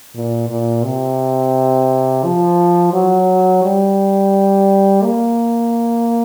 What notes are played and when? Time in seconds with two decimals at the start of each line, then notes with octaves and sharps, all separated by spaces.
0.15 A#2
0.49 A#2
0.84 C3
2.24 F3
2.93 F#3
3.64 G3
5.03 A#3